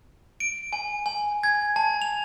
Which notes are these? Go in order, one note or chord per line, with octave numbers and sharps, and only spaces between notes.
D7
G#5
G#5
G#6
A5
F7